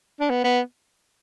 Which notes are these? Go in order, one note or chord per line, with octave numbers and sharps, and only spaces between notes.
D4
B3
B3